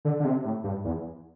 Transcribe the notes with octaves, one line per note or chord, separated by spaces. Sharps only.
D3
D3
C3
A2
G2
E2